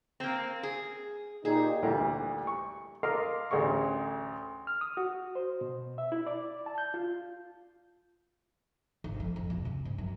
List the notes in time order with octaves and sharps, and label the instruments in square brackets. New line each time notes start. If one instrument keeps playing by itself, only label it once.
[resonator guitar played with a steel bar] A#3 C4
G#4
[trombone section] A#2 D#4 G4 [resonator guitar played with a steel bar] G#4
[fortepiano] D2 A#2 E3 G3 A3 G4
C#6
A4 A#4 D#5 F5 C6 D6
A1 D2 G#4 C#6
[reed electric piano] F6
D#6
F#4
C5
B2
E5
E4
D5
A5
G6
F4
[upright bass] G#1
F2
F2
B2
C#3
G#2
F#2